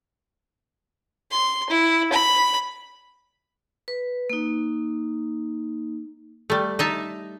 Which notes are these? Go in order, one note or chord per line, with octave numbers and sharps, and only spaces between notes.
C6
E4
B5
B4
A#3 D#4
G3 A3
D#4 E5 A5